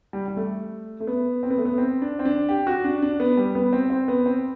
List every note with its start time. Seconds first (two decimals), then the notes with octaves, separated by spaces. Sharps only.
0.13 G3
0.28 G3
0.37 A3
1.00 A3
1.07 B3
1.43 C4
1.50 B3
1.58 A3
1.66 B3
1.78 C4
2.02 D4
2.19 C4
2.25 D4
2.49 G4
2.67 F#4
2.84 D4
3.02 D4
3.20 B3
3.37 G3
3.55 B3
3.73 C4
3.90 C4
4.08 B3
4.26 C4